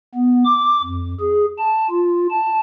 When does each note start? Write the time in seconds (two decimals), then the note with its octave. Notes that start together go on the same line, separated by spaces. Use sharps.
0.15 B3
0.45 D6
0.83 F2
1.20 G#4
1.58 A5
1.90 F4
2.30 A5